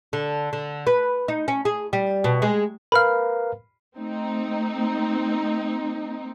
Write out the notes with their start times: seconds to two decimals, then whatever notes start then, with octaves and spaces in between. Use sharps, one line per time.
0.13 D3
0.53 D3
0.87 B4
1.28 D#4
1.48 C#4
1.65 G#4
1.93 G3
2.24 B2
2.42 G#3
2.92 A#4 B4 F5 B5 F6
3.97 A3 C4 D#4